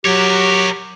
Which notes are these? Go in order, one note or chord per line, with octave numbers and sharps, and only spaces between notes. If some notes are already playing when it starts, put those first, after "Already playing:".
F#3 G4 A#4 C#5